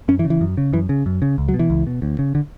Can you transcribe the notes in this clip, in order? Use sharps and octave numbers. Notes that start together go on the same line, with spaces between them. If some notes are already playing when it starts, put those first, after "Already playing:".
F#2 C#4
E3
C#3
E3
F#2
C#3
F#2 E3
C#3
F#2
C#3
C#2
F#3
B2
E3
C#2
B2
D2
C#3
D3